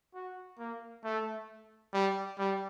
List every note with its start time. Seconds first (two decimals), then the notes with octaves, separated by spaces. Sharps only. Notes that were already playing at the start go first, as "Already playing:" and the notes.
0.14 F#4
0.59 A#3
1.04 A3
1.93 G3
2.38 G3